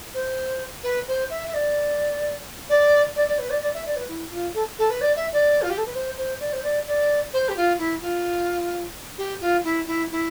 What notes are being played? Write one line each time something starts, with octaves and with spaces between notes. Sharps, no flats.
C5
B4
C5
E5
E5
D5
D5
D5
D5
B4
D5
D5
E5
D5
B4
E4
F4
A4
A4
B4
D5
E5
D5
F4
G4
A4
B4
C5
C5
D5
C5
D5
D5
C5
G4
F4
E4
F4
G4
F4
E4
E4
E4